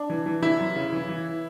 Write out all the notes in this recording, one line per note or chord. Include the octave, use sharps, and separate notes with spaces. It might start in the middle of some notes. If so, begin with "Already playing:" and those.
Already playing: D4
E3
E3
E3 E4
F#2
C#3
E3
E3